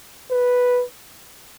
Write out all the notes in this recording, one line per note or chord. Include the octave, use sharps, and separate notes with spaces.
B4